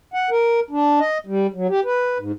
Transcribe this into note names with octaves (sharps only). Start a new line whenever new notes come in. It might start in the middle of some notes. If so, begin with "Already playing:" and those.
F#5
A#4
D4
D#5
G3
F#3
G4
B4
G#2